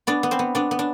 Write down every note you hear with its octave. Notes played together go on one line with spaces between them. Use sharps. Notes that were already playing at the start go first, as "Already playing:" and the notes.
B3 D4 D5
B3
C4 C5
B3
B3 D4 D5
B3
D4